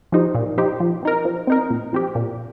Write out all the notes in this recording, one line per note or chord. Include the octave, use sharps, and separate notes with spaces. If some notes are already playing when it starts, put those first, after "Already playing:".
F3 D#4 G4 C5
A#2
F3 D#4 G4 C5
F3
C4 D#4 A#4
F3
C4 D#4 A#4
A#2
F3 C4 G4
A#2